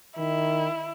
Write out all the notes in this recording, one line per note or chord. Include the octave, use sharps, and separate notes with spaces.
D#3 E4